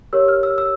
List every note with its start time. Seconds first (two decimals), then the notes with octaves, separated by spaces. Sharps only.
0.13 G4 A#4 C#5 E6
0.28 F6
0.43 E6
0.58 E6